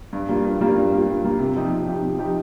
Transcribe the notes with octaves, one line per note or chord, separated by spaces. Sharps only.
G2
G3 A#3 F4
G2
G3 A#3 F4
G2
G3 A#3 F4
G2
G3 A#3 F4
C3
F3 D#4 G4
C3
F3 D#4 G4
C3
F3 D#4 G4